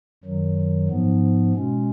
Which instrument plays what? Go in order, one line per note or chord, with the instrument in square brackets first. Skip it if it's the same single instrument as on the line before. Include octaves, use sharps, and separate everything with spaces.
[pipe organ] F#2 D#3 F#3
G#2 F3 B3
B2 G#3 C#4